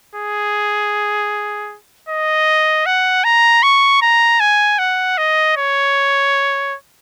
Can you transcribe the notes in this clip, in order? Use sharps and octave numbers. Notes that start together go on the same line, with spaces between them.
G#4
D#5
F#5
A#5
C#6
A#5
G#5
F#5
D#5
C#5